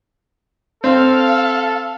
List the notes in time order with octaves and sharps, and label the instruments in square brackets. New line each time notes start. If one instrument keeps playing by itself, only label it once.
[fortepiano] C4 [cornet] A4 [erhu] F5